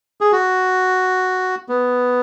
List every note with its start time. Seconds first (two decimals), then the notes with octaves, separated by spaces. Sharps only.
0.21 G#4
0.32 F#4
1.69 B3